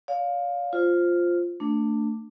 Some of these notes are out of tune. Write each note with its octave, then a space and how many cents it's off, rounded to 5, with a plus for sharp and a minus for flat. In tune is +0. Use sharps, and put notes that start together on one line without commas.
D5 -45 F5 +15
F4 +0 C5 +0
A3 +25 D4 +0